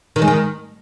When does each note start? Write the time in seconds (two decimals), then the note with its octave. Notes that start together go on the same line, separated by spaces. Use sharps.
0.16 D#3
0.22 G#3
0.28 D#3